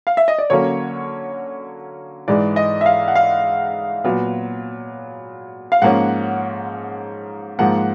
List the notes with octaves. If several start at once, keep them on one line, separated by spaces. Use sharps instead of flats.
F5
E5
D#5
D5
D3 F#3 A#3 C#4 C#5
G#2 E3 G#3 D5
D#5
E5
F5
F#5
F5
A#2 F#3 B3
F5
G#2 F3 A#3 C#4 F#5
G#2 F3 A#3 F#5